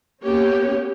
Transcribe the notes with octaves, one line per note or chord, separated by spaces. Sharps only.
A#3 B3 C#4 G4 C#5